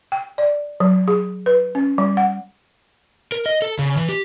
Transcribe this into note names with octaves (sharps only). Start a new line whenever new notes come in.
G5
D5
F#3
G#4
B4
C#4
G3
F#5
A#4
D#5
A4
C#3
E3
G4